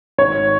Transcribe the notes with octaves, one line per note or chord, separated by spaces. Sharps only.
G#1 C#5